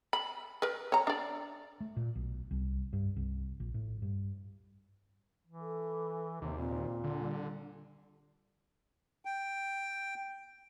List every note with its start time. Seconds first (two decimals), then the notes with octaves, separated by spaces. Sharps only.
0.13 B5
0.62 A#4 B4
0.92 C#5 A#5
1.07 D4 D5
1.80 A3
1.96 A#2
2.15 B1
2.51 C2
2.93 G2
3.16 C2
3.60 A#1
3.74 A2
4.02 G2
5.47 E3
5.60 A4
6.42 D#2 C3
6.58 A#2 C4
7.04 D3
7.18 G3
9.25 G5